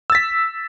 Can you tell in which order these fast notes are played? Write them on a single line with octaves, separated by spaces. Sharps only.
E6 A6 B6